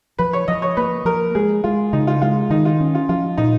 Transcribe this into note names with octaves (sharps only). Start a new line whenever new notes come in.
F3 B4
C#5
F3 D#5
C#5
A#3 B4
F3 A#4
G#3 G#4
G#3 F4
C#3 D#4
F4
G#3 F4
D#3 D#4
F4
C#4
F4
F3 F4
A#2 D#4